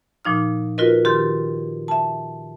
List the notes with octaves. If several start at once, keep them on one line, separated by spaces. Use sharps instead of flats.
A#2 F3 D#4 F6
F4 F#4 A#4 B4 D#5
D#3 G4 C6 F6 G6 A6
E5 A5